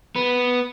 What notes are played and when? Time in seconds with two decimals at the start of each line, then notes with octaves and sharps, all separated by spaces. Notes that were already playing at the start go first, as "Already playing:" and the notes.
0.16 B3